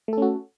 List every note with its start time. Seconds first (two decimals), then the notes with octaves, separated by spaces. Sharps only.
0.08 A3
0.13 A4
0.18 C#4
0.22 F#4